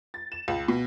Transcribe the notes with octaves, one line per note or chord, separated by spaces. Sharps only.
A6
E7
C#2
B2